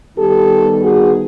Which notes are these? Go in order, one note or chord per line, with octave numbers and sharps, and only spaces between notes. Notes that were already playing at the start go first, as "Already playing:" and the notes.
D#3 G3 B3 D#4 G4 A4
F#4 G#4